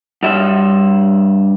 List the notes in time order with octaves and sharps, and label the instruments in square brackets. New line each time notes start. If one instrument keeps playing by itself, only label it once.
[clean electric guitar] G2 E5